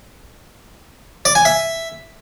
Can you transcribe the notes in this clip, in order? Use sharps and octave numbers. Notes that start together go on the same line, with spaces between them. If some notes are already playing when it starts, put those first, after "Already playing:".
D5
G#5
E5